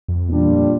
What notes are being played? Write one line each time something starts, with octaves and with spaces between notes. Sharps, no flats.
F2
E2 A#2 G3 D4 F4
F2